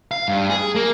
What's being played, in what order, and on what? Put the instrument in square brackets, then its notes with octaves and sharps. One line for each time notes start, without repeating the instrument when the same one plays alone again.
[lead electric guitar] F5
G2
G#4
A#3